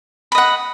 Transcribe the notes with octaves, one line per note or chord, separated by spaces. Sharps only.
D#5 F#5 B5